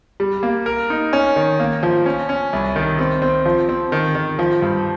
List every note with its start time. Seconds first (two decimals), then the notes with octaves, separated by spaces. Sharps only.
0.20 G3
0.43 A#3
0.66 A#4
0.90 D#4
1.13 C#4
1.36 D#3
1.60 A#3
1.83 F3
2.06 C#4
2.29 C#4
2.53 C2
2.76 D#3
2.99 C4
3.22 C4
3.45 F3
3.69 C4
3.92 D#3
4.15 D#3
4.39 F3
4.62 G2